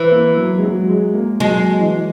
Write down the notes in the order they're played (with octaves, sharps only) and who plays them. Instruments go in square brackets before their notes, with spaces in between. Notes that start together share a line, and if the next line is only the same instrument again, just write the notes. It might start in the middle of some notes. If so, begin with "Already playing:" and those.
Already playing: [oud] E3
[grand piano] A#3
F#3
G#3
F#3
G#3
A#3
[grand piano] F#3 [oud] G#3
[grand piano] E3